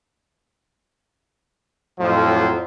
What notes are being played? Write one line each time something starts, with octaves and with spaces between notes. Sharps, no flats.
F2 A2 F3 F#3